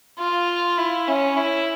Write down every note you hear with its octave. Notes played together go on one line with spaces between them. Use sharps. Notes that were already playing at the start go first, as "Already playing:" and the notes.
F4
E4
C#4
E4